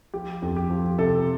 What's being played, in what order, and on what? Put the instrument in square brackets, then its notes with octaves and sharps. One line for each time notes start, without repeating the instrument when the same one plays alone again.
[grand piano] F3 G4
F2
G4
F3
C3 A4